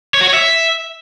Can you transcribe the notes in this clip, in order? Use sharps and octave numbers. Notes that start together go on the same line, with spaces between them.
C#5
F#4
C#5
E5